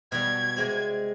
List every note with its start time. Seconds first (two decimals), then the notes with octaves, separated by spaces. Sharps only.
0.12 B2 G3 G#6
0.56 C3 G#3 C4